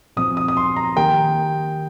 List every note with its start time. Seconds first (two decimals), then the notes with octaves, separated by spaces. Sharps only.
0.17 A#2 F3 C4 D#6
0.37 D#6
0.48 D#6
0.57 C6
0.76 A#5
0.96 D#3 A#3 G4 A#4 G5